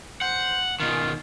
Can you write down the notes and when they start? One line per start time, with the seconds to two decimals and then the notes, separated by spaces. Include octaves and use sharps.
0.21 C5 F#5
0.80 B2 D#3 F4